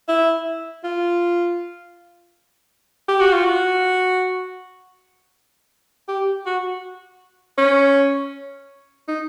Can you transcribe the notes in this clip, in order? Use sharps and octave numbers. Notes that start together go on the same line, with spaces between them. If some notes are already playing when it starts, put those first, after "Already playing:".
E4
F4
G4
F#4
F4
F#4
G4
F#4
C#4
D#4